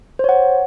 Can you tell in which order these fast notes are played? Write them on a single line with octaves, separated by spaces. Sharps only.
C5 C#5 F#5